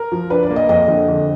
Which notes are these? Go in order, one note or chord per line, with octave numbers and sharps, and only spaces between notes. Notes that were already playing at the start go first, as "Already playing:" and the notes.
Already playing: A#4
F3
D4 B4
D5
A#3
D#5
F2 D#5
D3
F2